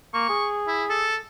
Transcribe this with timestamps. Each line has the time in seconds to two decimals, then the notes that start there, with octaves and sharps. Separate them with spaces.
0.14 A#3 C#6
0.29 G#4
0.67 E4
0.90 A4